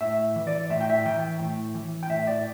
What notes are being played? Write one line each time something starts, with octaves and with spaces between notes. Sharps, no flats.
A2 E5
E3
D5
A2 E5
G5
E5
E3 G5
A2
E3
G5
A2 E5
D5